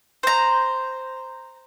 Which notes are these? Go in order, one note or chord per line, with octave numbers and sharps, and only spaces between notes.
C5 A#5